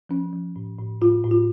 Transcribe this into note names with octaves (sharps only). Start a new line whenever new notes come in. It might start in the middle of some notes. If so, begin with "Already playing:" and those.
F3 C#4
F3
A2
A2
A2 F4
A2
F4